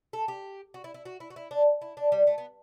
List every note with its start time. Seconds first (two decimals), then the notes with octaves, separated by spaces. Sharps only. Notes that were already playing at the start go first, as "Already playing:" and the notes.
0.13 A4
0.28 G4
0.74 F#4
0.84 E4
0.94 E4
1.05 F#4
1.20 E4
1.30 F#4
1.36 E4
1.51 D4
1.82 E4
1.97 D4
2.12 G3
2.27 A3
2.38 B3